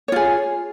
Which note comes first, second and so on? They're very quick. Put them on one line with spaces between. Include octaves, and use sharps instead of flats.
C#5 F4 G#4